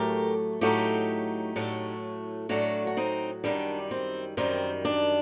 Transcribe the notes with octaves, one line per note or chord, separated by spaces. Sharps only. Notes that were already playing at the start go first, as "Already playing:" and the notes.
Already playing: A2 F#3 A3 G4 A#4
A2 F#3 A3 D#4 G4
A2 F#3 A3
A2 F#3 A3 D4 F#4
F#4
C4 D#4
F#2 D#3 G3 D4
C4
F#2 D#3 G3 C4
D4